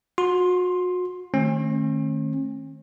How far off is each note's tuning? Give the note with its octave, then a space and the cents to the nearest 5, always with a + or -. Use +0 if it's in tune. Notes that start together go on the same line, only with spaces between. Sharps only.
F#4 -35 C6 +10
D#3 -10 A3 +0 C#4 -45